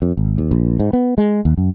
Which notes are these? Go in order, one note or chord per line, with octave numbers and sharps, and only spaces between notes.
F2
G#1
D#2
A#1
G#2
B3
G#3
D#2
F#2